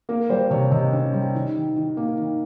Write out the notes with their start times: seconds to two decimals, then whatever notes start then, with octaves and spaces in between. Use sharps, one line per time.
0.09 A#3 A#4
0.30 G3 C5
0.50 C3 C#5
0.71 C3 D#5
0.93 C#4
1.13 G3
1.34 D#3
1.55 D#3
1.76 D#3
1.97 A#3
2.18 D#3